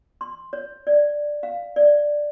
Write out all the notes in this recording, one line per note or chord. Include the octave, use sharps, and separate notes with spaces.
C6
C#5
D5
F5
D5